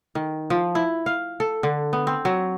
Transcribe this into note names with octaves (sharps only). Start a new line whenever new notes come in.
D#3
F3
E4
F5
A4
D3
B3
C4
F#3